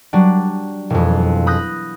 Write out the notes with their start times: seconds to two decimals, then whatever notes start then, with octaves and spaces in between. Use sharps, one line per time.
0.13 F#3 G3 D4
0.90 E1 F2
1.47 B5 D#6 F#6 G6 A#6